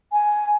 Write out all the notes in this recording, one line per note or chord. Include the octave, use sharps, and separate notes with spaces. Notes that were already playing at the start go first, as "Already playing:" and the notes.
G#5